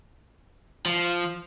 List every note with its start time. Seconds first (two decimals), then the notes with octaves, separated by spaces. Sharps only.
0.86 F3